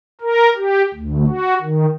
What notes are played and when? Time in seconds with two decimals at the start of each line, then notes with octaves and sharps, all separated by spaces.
0.21 A#4
0.56 G4
0.94 D2
1.27 F#4
1.62 D#3